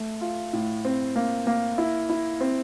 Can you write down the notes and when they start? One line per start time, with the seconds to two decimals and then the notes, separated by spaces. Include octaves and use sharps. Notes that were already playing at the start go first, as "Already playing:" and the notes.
Already playing: A3
0.21 F4
0.53 A2
0.85 C4
1.16 A#3
1.47 A#3
1.78 E4
2.10 E4
2.40 C4